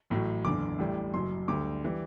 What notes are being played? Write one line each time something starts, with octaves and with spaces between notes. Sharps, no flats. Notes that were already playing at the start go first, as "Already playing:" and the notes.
A1 A2 F#3
F#1 E2 D3 D6
A1 A2 G3
F#1 F#2 F#3 C6
D2 D3 G3 D6
E3 G3